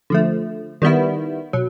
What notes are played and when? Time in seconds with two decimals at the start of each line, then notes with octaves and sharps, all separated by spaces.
0.10 D3 F3 A3
0.82 D#3 G3 B3 E4
1.53 B2 F#3